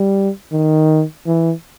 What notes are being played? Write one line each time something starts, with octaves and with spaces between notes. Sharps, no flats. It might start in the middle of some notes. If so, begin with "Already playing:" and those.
Already playing: G3
D#3
E3